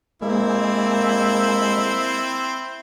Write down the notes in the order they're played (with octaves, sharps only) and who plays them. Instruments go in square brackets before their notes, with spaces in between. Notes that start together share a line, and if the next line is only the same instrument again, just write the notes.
[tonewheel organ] G#3 [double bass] A#3 [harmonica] C4 E4